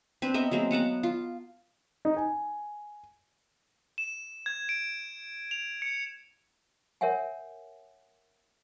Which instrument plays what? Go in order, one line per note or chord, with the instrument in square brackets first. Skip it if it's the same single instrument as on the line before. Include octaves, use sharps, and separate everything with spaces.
[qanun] C4 D4 B4
B3 A#4 D#5 E5
F#3 G#3 A#3 C4
B3 F#5 A5 A#5
F4
[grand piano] D#4
G#5
[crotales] E7
G#6
D7
F7
C#7
[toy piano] A#4 C#5 E5 F#5 G#5